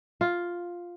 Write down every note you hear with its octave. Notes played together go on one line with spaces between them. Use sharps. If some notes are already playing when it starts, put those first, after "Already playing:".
F4